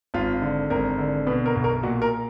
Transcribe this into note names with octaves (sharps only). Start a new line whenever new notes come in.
G#1 F4
D3
G#1 A#4
D3
B2 B4
A#4
B1
A#4
A#2 F#4
A#4